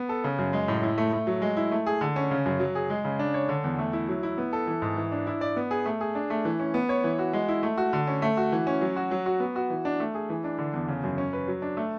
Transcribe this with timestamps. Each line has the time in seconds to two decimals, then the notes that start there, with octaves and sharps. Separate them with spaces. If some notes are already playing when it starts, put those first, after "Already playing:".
Already playing: B3
0.09 A4
0.24 C#3
0.38 F#2
0.53 G#3
0.68 A2
0.83 E4
0.98 A3
1.13 A3
1.27 F#3
1.42 G#3
1.57 E4
1.72 A3
1.87 G#4
2.01 D3
2.16 C#4
2.31 C#3
2.46 F#2
2.60 F#3
2.75 G#4
2.90 G#3
3.05 C#3
3.19 D4
3.34 C#5
3.49 D3
3.64 E2
3.79 A3
3.93 E4
4.08 F#3
4.23 E4
4.38 B3
4.53 A4
4.67 E3
4.82 G#2
4.97 E3
5.12 D4
5.27 E4
5.41 D5
5.56 B3
5.71 G#4
5.86 A3
6.01 G#4
6.15 D4
6.30 A3
6.45 E3
6.60 C#4
6.74 B3
6.89 C#5
7.04 E3
7.19 F#4
7.33 G#3
7.48 E4
7.63 A3
7.78 F#4
7.93 D3
8.07 C#4
8.22 A3
8.37 F#4
8.52 E3
8.67 C#4
8.81 F#3
8.96 F#4
9.11 F#3
9.26 F#4
9.40 B3
9.56 F#4
9.70 E3
9.85 D4
10.00 A3
10.15 G#4
10.30 E3
10.44 D4
10.58 D3
10.74 E2
10.88 C#3
11.04 F#2
11.18 C#4
11.33 B4
11.48 F#3
11.62 D4
11.77 A3